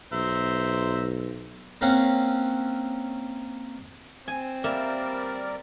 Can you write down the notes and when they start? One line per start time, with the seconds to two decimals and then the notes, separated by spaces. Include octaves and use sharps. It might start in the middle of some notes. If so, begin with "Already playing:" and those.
0.13 B1 C5 E5 A#5
1.81 A#3 C4 C#4 F#5
4.28 C4 G#5
4.64 G3 A#3 A#4 D5 E5 A#5